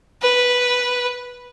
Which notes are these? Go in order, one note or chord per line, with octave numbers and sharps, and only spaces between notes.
B4